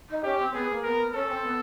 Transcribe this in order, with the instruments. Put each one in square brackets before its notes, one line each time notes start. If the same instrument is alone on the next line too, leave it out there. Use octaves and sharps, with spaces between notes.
[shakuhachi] D#4
[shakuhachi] C#4 [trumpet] G4
[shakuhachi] C4
[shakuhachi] B3 [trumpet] G#4
[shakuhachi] A#3
[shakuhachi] B3 [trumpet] A#4
[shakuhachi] C#4 [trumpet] A4
[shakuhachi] C4
B3